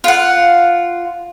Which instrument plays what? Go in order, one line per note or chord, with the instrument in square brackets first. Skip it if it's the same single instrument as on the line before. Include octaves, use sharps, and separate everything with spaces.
[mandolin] F4 F#5